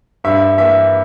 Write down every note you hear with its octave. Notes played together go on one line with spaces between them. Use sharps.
G2 E5
E3 A#3 E5